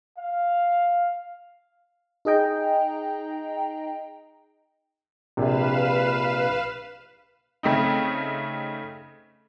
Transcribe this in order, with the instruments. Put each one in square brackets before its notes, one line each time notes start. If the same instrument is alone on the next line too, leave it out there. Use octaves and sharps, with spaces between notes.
[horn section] F5
[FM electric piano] D#4 G#4 D#5 G5 A#5
[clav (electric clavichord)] A#1 C3 [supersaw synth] B4 F5 E7
[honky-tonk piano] C#3 A3 C4 D#4